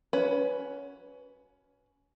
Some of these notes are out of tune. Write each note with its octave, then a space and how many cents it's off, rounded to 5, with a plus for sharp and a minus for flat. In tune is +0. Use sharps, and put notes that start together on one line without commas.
C#4 +20 F#4 +0 B4 +0